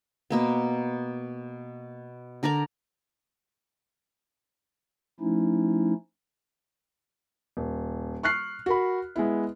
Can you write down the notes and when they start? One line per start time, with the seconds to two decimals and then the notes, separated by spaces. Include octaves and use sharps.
0.30 B2 A#3 B3
2.43 D3 A#4 D5 A#5
5.20 F3 A3 C#4 D#4 E4
7.57 D#1
8.23 C#6 F6 F#6 C7
8.66 F#4 A#4 B5
9.16 G#3 B3 E4